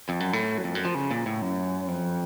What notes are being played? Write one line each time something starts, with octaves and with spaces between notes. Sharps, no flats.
F2
F#2
A2
F#2
F2
F#2
F3
C#3
A#2
A2
F#2
F2